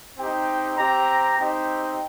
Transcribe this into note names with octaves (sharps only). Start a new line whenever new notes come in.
C4 D#4 G4 G5
C4 G4 A#5
C4 D#4 G4 G5